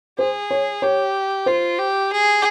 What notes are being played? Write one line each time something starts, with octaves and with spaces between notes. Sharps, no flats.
G#4 C5
C#5
G4 C#5
F4 C5
G4
G#4